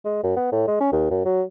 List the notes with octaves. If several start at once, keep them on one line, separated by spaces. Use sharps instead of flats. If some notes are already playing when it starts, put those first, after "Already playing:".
G#3
F#2
B3
A2
G#3
C#4
D#2
F#2
F#3